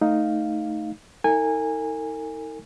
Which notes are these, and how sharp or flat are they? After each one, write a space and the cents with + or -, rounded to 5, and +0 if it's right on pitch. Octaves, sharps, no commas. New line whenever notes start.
A3 +0 D#4 +0 F5 +0
D#4 +40 A#4 -45 G#5 -20